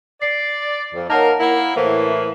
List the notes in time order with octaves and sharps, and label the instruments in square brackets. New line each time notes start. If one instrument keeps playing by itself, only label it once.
[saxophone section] D5 [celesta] C7
[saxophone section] F2
[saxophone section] A#3 D#4 A#4 [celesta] C#5 F#5 A5
[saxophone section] A#3 E4 [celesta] F#5
[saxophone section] A2 E3 A#3 [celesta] C5